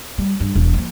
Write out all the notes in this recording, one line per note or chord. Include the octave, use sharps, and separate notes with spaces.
G3
G2
E1
F3 A#3